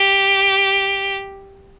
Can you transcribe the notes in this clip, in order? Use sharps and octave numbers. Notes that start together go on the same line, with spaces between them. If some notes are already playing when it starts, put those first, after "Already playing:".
Already playing: G4